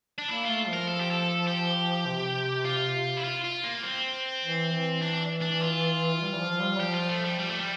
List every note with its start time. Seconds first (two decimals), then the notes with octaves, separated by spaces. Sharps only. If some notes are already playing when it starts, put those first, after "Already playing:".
0.18 D4
0.29 A#3 E4
0.43 F4
0.49 A3
0.68 F3
0.73 A#4
0.88 A4
1.00 G4
1.11 A4
1.48 G4
2.06 C3
2.65 F4
3.17 E4
3.24 F4
3.44 F4
3.64 A#3
3.83 C4
4.44 E3
4.72 E3
5.02 D4
5.42 D4
5.61 F4
6.21 G3
6.34 E3
6.40 F3
6.60 G3
6.79 F3 G4
6.94 F4
7.09 A3
7.25 G3
7.39 G3
7.50 A3
7.60 G3